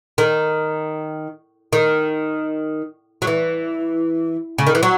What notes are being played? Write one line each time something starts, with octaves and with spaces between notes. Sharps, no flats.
D#3
D#3
F#3
E3
C#3
D#3
E3
F#3